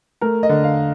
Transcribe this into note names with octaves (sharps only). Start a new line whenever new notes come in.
A3 A#4
D#5
D3
F5